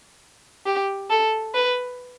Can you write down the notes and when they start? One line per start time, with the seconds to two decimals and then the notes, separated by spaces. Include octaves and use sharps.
0.66 G4
1.10 A4
1.54 B4